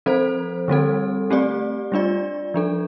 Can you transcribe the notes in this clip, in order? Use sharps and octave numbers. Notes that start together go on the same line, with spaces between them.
F3 C4 A4 C5
D3 G3 C4 A4
A3 C4 G4 D5
G3 D4 F4 D5
F3 D4 A4